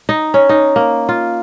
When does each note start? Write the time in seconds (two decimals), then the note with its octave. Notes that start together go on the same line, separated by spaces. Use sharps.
0.09 D#4
0.34 C#4
0.49 D#4
0.76 A#3
1.09 F4